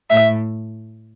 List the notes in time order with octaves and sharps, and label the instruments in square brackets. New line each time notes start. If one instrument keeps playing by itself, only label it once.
[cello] A2 [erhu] E5